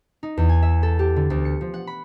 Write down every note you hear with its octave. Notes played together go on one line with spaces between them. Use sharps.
D#4
E2
G#5
E5
A4
G4
D3
D2
C#7
F3
F#5
B5